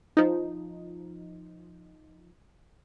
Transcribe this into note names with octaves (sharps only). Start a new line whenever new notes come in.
F3 D#4